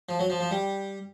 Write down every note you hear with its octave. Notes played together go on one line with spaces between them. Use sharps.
F3
F#3
F3
F3
G3